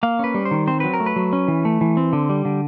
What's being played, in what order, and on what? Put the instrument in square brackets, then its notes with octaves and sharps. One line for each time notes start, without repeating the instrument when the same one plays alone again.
[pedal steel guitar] A#3 F5
C#4 B4
G3
C5
D#3
C4 C5
F#3 B4
A#4
A3
B4
F#3
C#4
E3
A3
E3
C4
D3
G3
D3